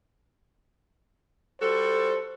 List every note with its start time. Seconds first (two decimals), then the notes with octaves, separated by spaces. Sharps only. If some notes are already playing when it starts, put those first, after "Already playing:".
1.61 G3 F#4 A4 C5